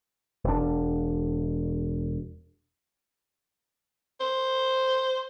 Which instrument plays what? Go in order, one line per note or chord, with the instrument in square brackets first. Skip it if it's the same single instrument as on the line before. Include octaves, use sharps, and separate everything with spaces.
[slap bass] E1 D4
[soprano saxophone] C5